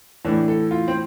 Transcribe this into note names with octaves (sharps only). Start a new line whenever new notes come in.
A2 E3 D4
A4
F4
C4